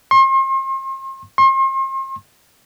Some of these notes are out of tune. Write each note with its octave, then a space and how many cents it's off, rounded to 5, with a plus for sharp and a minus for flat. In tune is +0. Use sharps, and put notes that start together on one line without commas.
C6 +40
C6 +40